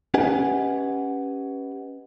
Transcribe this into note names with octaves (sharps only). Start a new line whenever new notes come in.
C#4 G4 B4 D#5 F#5 G#5